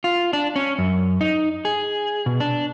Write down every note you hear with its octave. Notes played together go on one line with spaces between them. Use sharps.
F4
D4
C#4
F#2
D#4
G#4
B2
D4